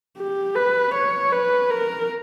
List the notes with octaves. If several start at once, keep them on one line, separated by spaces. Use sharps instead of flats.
G4
B4
C#5
B4
A#4